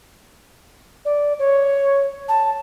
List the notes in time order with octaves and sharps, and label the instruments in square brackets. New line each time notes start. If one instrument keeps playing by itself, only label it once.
[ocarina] D5
C#5
A5